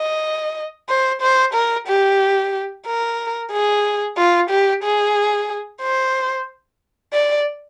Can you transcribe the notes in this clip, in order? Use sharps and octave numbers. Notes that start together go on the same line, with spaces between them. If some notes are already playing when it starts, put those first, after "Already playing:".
Already playing: D#5
C5
C5
A#4
G4
A#4
G#4
F4
G4
G#4
C5
D5